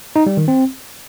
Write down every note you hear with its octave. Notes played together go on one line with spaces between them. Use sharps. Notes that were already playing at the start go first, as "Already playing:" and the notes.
D#4
G3
D#3
C4